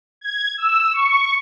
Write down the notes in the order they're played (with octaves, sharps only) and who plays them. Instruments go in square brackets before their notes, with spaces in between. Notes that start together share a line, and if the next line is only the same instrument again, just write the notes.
[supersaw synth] G#6
E6
C#6